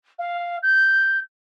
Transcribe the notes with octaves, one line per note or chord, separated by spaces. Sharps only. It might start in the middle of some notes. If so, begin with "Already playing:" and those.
F5
G6